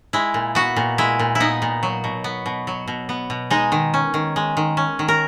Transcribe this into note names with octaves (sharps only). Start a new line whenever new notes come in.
G#3 E4
A#2
B3 F#4
A#2
G#3 E4
A#2
E4
B3 D#4
A#2
F#3
B2
B3
B2
F#3
B2
B3
B2
G#3 D#4
D#3
C#4
D#3
G#3
D#3
C#4
D#3
A#4